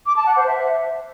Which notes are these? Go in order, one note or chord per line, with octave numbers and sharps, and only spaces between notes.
D6
A5
F#5
C5
E5